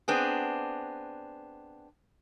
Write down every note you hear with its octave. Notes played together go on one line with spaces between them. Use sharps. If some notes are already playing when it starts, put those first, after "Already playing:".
B3 C4 D4 G#4